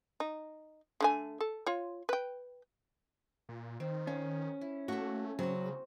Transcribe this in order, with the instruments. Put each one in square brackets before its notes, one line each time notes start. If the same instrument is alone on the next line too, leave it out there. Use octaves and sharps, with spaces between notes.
[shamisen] D#4
D3 A3 G#5
A4
F4 C#5
B4 G5
[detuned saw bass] A#2
[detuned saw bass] D#3 [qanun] C4
[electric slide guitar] C#4 [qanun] F5
[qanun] E4
[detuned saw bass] A3 [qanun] A#3 E5 [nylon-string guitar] F#4
[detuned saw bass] C#3 [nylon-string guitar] F#3 [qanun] C4 F#4